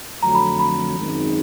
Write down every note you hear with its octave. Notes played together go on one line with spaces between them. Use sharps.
F2 D3 F#3 A3 A#5
B5
B5
G#1 F#2 D#3 G#3